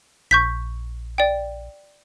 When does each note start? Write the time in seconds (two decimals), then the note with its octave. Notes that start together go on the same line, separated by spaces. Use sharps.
0.31 A#1 C#6 G6 B6
1.18 D5 G5